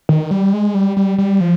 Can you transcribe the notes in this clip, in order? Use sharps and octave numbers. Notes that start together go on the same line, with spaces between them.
D#3
G3
G#3
G3
G3
G3
F3